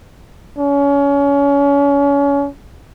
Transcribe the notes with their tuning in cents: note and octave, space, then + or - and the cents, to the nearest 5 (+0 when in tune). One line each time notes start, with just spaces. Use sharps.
C#4 +30